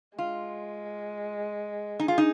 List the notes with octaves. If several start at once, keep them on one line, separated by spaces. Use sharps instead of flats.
G#3 F4
D#4 G#4
F4
D#4